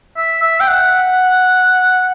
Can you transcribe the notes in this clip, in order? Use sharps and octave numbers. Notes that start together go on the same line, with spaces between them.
E5
E5
G5
F#5